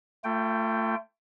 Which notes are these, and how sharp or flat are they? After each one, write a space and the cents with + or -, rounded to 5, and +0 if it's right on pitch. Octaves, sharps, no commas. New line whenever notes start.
A3 +25 F4 -20 G5 +0